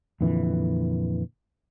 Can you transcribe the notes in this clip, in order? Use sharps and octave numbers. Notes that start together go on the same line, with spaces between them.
F2 A#2 D3 E3